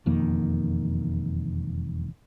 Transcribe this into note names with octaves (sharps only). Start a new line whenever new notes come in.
E1 F2 D#3 A#3